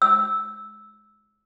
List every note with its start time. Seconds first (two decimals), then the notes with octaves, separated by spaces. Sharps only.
0.02 E6